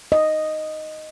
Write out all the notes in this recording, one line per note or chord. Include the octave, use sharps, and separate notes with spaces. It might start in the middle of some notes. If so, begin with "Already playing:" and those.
D#5